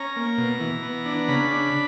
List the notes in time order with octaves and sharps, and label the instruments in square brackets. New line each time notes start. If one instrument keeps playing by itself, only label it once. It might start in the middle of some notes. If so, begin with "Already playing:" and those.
Already playing: [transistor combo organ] C#4 A#5
A#3
B2
E3
B3
D4
C#3 B5
D4